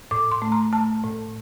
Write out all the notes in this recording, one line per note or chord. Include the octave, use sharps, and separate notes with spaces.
A2 D6
C6
A3
A#5
A3 A5
A2